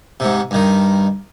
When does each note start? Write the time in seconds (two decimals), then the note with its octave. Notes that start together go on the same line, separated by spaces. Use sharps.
0.20 G#2 C3
0.51 G2 D#3